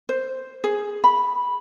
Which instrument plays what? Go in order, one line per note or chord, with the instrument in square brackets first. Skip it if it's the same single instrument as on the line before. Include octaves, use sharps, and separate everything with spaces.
[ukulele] C5
G#4
B5